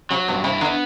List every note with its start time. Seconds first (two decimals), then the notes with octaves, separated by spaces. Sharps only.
0.11 C3 F#3
0.28 G2 B2
0.44 C3 E4
0.61 D3 B3